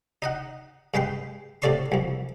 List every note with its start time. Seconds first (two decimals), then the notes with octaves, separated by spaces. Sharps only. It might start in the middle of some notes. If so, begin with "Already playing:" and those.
0.22 D#4 D#5 F#5
0.94 G2 G#3 B4 G5 C6
1.62 A2 C3 A4 D5 C6 C#6
1.92 C2 F2